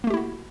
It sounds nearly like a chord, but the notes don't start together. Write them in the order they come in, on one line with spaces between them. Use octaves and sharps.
A#3 A3 G4 E4 F#4